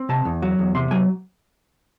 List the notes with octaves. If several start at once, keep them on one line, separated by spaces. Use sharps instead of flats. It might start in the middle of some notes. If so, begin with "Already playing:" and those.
Already playing: C4
C3 A5
E2
F#3
E2
C3 C6
F#3 G#5